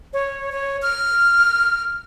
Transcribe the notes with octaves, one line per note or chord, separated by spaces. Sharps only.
C#5
C#5
F6